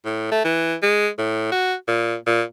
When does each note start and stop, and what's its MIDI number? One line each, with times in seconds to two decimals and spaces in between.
0.05 0.30 45
0.32 0.41 57
0.45 0.74 52
0.83 1.08 56
1.19 1.51 45
1.52 1.74 66
1.88 2.15 46
2.26 2.43 46